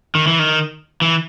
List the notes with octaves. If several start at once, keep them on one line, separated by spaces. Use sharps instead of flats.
D#3
E3
D#3
E3